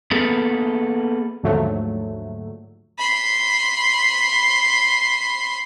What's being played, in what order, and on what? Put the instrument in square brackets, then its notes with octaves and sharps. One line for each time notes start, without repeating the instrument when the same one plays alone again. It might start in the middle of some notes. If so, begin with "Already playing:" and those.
[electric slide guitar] A#3 B3 G#4 A4 B4
[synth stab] D#2 G#2 D3 F3 F#3 A3
[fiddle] B5 C6